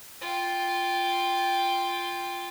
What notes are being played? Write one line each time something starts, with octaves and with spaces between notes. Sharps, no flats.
F4 G5